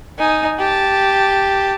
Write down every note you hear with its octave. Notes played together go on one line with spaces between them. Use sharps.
D#4 G#5
G4 A5